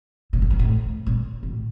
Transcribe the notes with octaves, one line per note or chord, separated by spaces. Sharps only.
A#2
A2
G#2
A2
A#2
A2